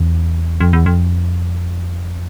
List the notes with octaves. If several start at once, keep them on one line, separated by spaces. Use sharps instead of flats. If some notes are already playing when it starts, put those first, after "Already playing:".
Already playing: E2
F2
E2
F2